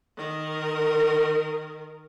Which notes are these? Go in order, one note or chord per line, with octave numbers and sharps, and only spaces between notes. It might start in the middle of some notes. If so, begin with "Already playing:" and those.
D#3 A#4